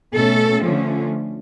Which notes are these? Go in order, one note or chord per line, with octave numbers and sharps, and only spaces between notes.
B2 A3 C#4 A4
D3 F3 A3 C#4